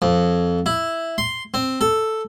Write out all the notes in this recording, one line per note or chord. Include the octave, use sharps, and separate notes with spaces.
F2
E4
C6
C4
A4